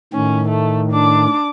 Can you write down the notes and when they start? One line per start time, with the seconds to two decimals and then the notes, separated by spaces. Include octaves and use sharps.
0.14 A2 D#3 C#4
0.49 A3
0.92 D4 D6